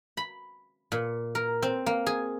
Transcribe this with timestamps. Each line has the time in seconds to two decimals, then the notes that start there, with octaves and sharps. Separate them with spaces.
0.17 B5
0.92 A#2
1.35 A#4
1.62 C4
1.86 A#3
2.06 G#4